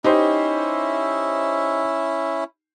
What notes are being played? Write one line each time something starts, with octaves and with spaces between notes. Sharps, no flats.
C#4 D#4 E4 G4 C5 E5